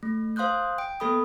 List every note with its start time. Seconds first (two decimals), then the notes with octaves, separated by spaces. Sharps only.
0.03 A3
0.36 C5 F5 C6 D#6 F#6 G6
0.78 G5 D7
1.00 A#3 B3 A4 B5 D#6